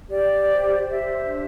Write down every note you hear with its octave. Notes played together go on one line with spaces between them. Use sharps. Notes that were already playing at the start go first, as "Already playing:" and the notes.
G4 D5
C5
G4 E5
D4